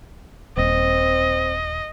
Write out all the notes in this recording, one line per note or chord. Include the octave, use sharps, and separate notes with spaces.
D#1 C4 D#5